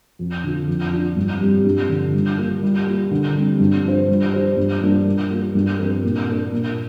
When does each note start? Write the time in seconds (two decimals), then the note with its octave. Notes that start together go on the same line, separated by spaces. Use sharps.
0.19 F2
0.44 D3 F3
0.67 F2
0.92 F3 D4 F4
1.16 G2
1.41 G3 C4 G4
1.65 G2
1.89 D3 F3
2.14 G3
2.38 A#3 F4
2.63 G3
2.87 A#3 F4
3.11 D3
3.35 G3 C4
3.60 G2
3.84 F3 D4 F4 C5
4.09 G3
4.33 D4 G4 C5
4.57 G2
4.81 G3 A#3 D4 F4
5.05 G3
5.31 A#3 F4
5.55 G2
5.79 F3 C4 A#4
6.03 A#2
6.27 A#3 D4 A#4
6.52 A#2